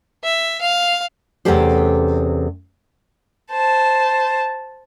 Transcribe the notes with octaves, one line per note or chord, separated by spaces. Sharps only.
E5
F5
E2 C3 A3 C#4 G4 C5
C5 A5